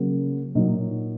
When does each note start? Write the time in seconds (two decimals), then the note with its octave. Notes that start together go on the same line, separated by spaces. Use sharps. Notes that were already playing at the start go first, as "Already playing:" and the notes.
Already playing: C#3 F#3 A#3
0.55 A#2 F#3 D#4